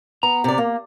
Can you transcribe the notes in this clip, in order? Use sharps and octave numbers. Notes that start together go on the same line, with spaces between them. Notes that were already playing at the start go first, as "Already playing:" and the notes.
B3 A#5
C3 D5
A#3